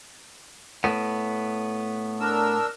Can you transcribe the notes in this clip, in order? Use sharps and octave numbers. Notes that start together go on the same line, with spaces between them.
A2 B3
D4 A#4 E6